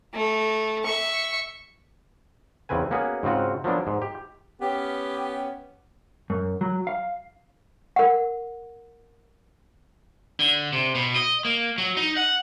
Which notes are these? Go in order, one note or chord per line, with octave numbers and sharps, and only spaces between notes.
A3
E5 C#6
E2 C#3 C4 B4 G#5
A#3 B3 C#4 F#4 G#4 B4
G#2 C#3 C4 F4 F#4
F3 F#3 A#3 B3 D4
G#2
G4
B3 C#4 G4
F#2
F#3
F5
A#4 F#5
D3
C3
B2
D#5
A#3
F#3
D#4
F#5